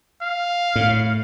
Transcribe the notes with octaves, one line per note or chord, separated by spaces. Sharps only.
F5
A2